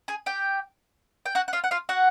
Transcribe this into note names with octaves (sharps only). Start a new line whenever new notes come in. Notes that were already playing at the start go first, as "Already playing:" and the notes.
G#4 G#5
G4 G5
G5
F#4 F#5
F#5
F4 F5
F#5
F4 F5
F#4 F#5